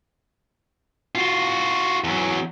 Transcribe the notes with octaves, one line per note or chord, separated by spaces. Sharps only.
F4 F#4
E2 F#3